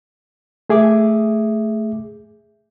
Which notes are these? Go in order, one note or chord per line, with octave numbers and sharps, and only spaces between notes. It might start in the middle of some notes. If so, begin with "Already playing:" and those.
A3 G#4 E5 D6